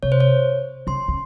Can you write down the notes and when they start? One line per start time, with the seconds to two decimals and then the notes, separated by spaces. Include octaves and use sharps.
0.03 C3 C#5
0.12 C5
0.20 C#5
0.87 C#3 C6
1.08 C#3